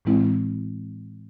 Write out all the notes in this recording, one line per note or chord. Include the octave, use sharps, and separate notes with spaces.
A2 E3 G#3 C4 E4